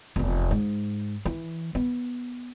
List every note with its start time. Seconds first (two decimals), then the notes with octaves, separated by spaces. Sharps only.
0.16 F1 E2
0.51 G#2
1.25 E3
1.75 B3